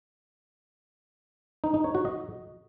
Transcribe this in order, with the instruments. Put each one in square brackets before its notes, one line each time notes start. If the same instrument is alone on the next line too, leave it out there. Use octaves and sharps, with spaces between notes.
[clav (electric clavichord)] D#4
D#4
C#5
F#4
D#5